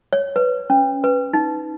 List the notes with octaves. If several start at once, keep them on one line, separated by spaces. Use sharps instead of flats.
C#5
B4
C#4
B4
D#4